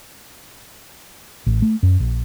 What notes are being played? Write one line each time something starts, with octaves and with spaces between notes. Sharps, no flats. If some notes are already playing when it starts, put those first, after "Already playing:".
A1
A3
F#2
A#1